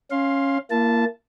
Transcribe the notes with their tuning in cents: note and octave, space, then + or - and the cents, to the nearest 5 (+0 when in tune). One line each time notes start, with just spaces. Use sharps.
C#4 -10 F5 +0 C6 +15
A#3 +0 E4 +45 A5 -5